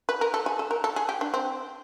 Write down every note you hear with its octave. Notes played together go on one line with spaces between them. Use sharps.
B4
A#4
A4
G#4
A4
A#4
A4
G#4
G4
D4
C4